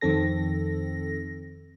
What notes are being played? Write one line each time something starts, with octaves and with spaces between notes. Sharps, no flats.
F2 D#3 C4 A4 A#6